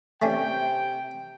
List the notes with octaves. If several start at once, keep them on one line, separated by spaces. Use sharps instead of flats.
C3 A3 C#4 D4 G5